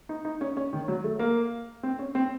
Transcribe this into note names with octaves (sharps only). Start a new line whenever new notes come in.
D#4
D#4
C#4
C#4
D#3
F#3
A3
A#3
C4
C#4
C4